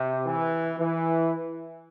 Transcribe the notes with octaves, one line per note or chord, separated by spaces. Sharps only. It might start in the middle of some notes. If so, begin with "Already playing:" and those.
Already playing: C3
E3
E3